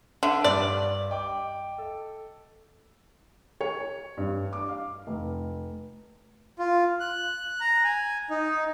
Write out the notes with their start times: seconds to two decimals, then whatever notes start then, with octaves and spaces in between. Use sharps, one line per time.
0.23 D3 E5
0.44 G2 D5
1.10 D#5 G5 D6
1.78 A4
3.61 C#5
4.17 G2
4.53 D6
4.69 F5
5.07 F1
6.59 F4
7.00 F#6
7.60 A#5
7.84 G#5
8.30 D#4